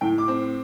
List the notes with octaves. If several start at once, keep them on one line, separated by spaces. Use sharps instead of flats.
A2 G5
D6
C4